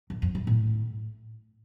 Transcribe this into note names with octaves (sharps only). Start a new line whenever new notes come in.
F#2
F2
F#2
A2